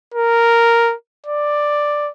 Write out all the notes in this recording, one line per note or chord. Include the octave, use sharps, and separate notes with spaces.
A#4
D5